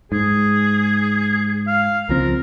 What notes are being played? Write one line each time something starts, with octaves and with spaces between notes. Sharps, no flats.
G#2 G#4
F5
C#2 F3 C4 A#4